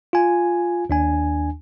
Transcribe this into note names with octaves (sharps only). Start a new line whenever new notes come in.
F4 G#5
D#2 D4 G#5